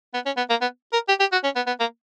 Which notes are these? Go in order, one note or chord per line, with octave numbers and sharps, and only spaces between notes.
B3
C#4
B3
A#3
B3
A#4
G4
G4
F#4
C#4
B3
B3
A#3